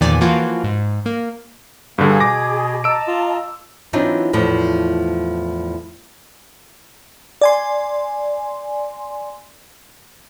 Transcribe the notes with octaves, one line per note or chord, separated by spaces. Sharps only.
E2 A#2 D#3 F3 D5 G#5
E3 F3 A#3 F4 F#4
G#2
A#3
G2 D3 A#3 G#4
B2 D6 A#6
D#5 A5 A#5 E6 D7
F4
E3 F#3 C4 D4 D#4 F4
E2 A2 F3
D5 G#5 C6